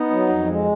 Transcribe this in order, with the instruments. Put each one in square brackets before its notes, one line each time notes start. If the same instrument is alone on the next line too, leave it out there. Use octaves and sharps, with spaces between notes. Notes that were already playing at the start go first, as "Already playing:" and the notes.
Already playing: [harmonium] B3 D#4
F#3
F2
G#3